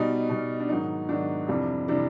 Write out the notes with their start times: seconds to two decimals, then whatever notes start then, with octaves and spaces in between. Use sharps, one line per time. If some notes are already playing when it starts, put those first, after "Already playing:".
Already playing: B2 G3 D#4
0.29 B2 G3
0.60 D4
0.69 G#2 D#3 F#3 D#4
1.09 G#2 D#3 F#3 D4
1.48 F2 C3 E3 G3
1.88 C3 E3 G3 D4